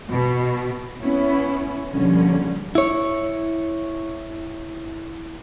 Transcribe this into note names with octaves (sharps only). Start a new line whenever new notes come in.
B2
B3 C#4 E4
B2 D3 F3 G3 A#3 C#4
E4 C#5